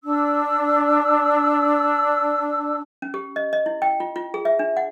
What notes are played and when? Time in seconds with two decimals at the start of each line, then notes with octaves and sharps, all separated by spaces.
0.04 D4 E6
3.02 C#4
3.14 G4
3.36 D#5
3.53 D#5
3.66 E4
3.82 G5
4.00 F4
4.16 F4
4.34 G#4
4.45 E5
4.59 D4
4.77 F#5